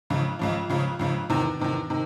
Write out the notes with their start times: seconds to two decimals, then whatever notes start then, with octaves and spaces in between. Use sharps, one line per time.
0.10 C#2 C#3 F3
0.39 C#2 C#3 F3
0.69 C#2 C#3 F3
0.99 C#2 C#3 F3
1.30 E2 C3 D#3
1.60 E2 C3 D#3
1.90 C3 D#3